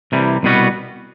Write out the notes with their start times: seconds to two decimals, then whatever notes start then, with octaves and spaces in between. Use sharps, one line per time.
0.12 C2 C3 E3 G3
0.43 C2 B2 G3 B3 F#4